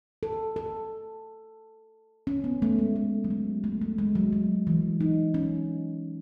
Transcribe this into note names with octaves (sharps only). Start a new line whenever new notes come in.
A4
A4
C#4
B3
A3
G#3
A3
F#3
G#3
A3
A3
G#3
F#3
F#3
E3
D#4
C#4